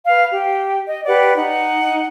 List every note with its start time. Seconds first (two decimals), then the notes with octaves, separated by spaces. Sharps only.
0.07 B4 F5
0.30 G4
0.88 D#5
1.06 G4 B4 D5 F#5
1.35 D#4 F#5